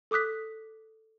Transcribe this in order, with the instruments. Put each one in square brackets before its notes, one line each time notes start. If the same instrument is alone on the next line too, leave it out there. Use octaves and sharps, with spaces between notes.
[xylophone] A4 D6 D#6 F#6 B6